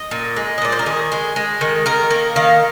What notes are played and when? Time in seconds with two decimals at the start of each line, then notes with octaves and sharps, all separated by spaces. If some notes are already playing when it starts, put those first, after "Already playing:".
Already playing: D#5
0.11 A#2
0.36 G#3
0.58 D#5
0.62 A#2 D5
0.72 C5
0.79 A#4
0.86 D#3 G#4
1.12 G#3
1.36 G#3
1.61 D#3
1.86 D#3 A#4
2.11 A#3
2.36 D#3 F5